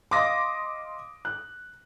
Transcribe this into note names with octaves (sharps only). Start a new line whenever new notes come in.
D#5 F5 C6 D6 D#6 A#6
F#6